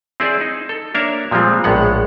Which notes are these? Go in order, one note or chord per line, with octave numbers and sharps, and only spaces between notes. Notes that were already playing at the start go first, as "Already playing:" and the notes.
C4 E4 G#4 C5 D5
D#4
A4
A#3 D4 A#4 C#5 E5
A#2 F3 G3 G#3 C4
A#1 A2 G#3 B3 F#5